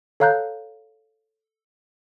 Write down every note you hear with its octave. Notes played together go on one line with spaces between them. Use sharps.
A4 C#5 F5 A#5 F#6 G6